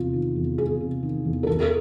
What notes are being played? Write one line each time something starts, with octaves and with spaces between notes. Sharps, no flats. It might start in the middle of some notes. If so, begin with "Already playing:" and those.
Already playing: E2 C3 F4
D#3
E2
E2 G#4
C3
D#3
E2
A#4
E2 A4
A#4